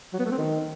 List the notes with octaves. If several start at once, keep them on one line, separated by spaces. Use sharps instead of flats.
F#3
B3
A3
C4
D#3